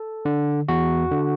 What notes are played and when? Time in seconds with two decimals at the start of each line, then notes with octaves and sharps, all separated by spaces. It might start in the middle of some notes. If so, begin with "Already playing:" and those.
Already playing: A4
0.25 D3
0.68 E2 F#4
1.11 D3